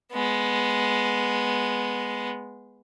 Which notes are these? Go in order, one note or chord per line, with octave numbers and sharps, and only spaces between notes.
G#3 B3